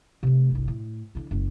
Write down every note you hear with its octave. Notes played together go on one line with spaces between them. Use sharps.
C3 A3
G1 C2
A2
D3 E3
F#1 G#3